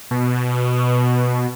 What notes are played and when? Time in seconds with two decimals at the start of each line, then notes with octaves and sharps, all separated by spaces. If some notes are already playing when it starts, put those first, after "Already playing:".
0.11 B2